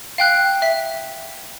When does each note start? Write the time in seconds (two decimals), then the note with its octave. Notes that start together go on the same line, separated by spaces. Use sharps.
0.18 F5 G5 F#6
0.62 E5 B6